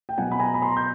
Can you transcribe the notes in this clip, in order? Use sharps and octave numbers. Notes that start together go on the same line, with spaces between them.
G5
B2 F#3 F#5 G#5
B5
G#5 A#5
B5
A#5 C6
G6